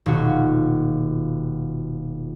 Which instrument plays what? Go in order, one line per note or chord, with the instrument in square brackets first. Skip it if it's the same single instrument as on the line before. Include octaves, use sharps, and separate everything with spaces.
[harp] D#1 B2 F4 F#4